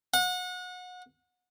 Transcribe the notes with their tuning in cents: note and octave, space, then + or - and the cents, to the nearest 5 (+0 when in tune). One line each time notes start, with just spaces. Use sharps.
F#5 -30